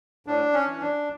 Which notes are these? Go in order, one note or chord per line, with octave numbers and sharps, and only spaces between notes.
A2 D4
C#4
E3
D4